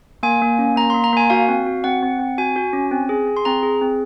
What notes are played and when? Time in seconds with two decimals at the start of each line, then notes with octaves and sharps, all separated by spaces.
0.23 A#3 G#5
0.41 A#3
0.59 C#4
0.76 A#3 A#5
0.90 A#3 C6
1.04 A#5
1.13 A#3 G#5
1.30 F#4 F5
1.48 C4
1.66 F#4
1.84 C4 F#5
2.02 C4
2.19 C4
2.38 F#4 G#5
2.56 F#4
2.73 C#4
2.91 C4
3.09 G#4
3.27 G#4
3.37 C6
3.45 C4 A#5
3.63 G#4
3.82 C4